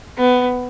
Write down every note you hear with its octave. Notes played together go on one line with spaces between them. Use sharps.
B3